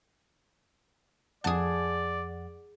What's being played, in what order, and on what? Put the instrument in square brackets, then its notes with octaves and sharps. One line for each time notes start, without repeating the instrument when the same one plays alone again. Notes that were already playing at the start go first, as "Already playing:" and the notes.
[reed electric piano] F2 F#5 [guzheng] G#4 A5 [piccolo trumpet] D5